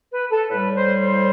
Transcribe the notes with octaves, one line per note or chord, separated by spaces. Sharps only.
B4
A4
A2 G3 B4
C5
C5